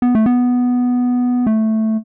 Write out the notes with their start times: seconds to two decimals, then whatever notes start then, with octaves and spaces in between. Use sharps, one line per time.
0.02 B3
0.15 A3
0.26 B3
1.47 A3